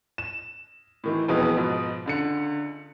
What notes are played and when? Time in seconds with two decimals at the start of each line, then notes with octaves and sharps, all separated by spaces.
0.18 E7
1.04 A2 D#3 E3
1.28 E1 F2 B2 E3 G#3 B3
1.57 G#2 B2 F3
2.06 C#2 D3 C#7